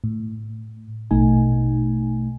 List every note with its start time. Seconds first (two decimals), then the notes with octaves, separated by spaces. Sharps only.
0.04 A2
1.11 A#1 B2 A3 D#4 G#5